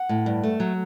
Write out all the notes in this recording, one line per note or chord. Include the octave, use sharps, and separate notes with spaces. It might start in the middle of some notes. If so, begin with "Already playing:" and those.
Already playing: F#5
A2
G2
A3
F#3